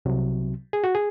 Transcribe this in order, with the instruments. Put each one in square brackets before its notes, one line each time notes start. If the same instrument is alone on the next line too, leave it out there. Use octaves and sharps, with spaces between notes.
[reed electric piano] C2 C3 F#3
G#4
F#4
G#4